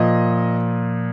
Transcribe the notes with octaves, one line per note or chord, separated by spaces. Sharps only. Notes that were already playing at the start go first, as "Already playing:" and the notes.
Already playing: A#2 F3 D#5